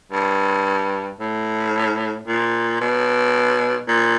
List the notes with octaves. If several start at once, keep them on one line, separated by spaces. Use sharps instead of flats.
G2
A2
A#2
B2
A#2